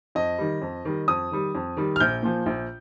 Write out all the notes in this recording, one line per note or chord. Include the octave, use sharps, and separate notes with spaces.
F2 D#5
D#3 G3
F2
D#3 G3
F2 D#6
D#3 G3
F2
D#3 G3
F6
A#1 G6
A#2 F3
A#1